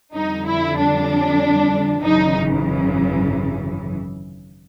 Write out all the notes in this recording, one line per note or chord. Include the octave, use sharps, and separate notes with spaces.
F2 D3 G3 D#4
E4
D4
G#1 F#2 C#3 E3 D#4